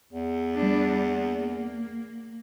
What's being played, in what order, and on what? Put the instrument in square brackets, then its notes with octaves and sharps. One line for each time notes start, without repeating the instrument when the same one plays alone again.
[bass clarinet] E2
[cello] G3 D4
A#3